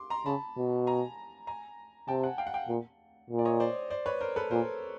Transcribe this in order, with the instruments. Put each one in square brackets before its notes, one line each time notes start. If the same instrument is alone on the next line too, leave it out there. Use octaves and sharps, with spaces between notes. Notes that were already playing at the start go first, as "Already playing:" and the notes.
Already playing: [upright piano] C6 D6
A#5 C6
[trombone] C#3 [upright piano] A5 B5
[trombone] B2
[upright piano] G#5 A#5
G#5 A#5
[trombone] C3 [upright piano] G5 A5
[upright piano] F#5 G#5
F5 G5
F#5
F5 G5
[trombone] A#2
A#2
[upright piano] D5
C#5 D#5
C5 D5
C5 D5
B4 C#5
A#4 C5
A4 B4
[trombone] A#2 [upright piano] A#4 C5